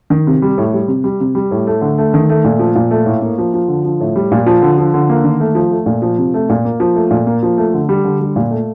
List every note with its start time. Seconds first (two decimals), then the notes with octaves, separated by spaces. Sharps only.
0.10 D#3
0.27 C3
0.42 G3
0.58 A2
0.73 G3
0.88 C3
1.04 G3
1.20 C3
1.35 G3
1.51 A2
1.67 A3
1.81 D3
1.98 A3
2.14 D#3
2.29 A3
2.44 A#2
2.59 F3
2.75 A#2
2.91 A3
3.06 A2
3.22 A#3
3.38 F3
3.54 F3
3.68 D3
3.84 F3
4.00 A2
4.16 G3
4.32 A#2
4.46 F3
4.62 D3
4.78 F3
4.94 D3
5.09 A#3
5.24 D#3
5.40 A3
5.55 F3
5.71 A3
5.86 A#2
6.02 F3
6.18 C3
6.34 A3
6.49 A#2
6.65 A#3
6.80 F3
6.95 A3
7.11 A#2
7.27 A#3
7.43 F3
7.58 A3
7.74 D3
7.89 G3
8.04 D3
8.20 G3
8.36 A#2
8.51 A3